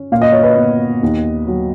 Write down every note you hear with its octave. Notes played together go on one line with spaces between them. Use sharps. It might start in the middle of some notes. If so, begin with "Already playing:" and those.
Already playing: C#4
A#2 F5
D#5
C#5
B4 D#5
B3
D#2
F#3